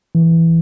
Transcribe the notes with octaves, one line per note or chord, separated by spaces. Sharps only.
E3